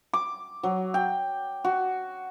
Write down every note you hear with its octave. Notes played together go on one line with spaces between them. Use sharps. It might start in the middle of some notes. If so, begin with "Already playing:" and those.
D6
F#3
G5
F#4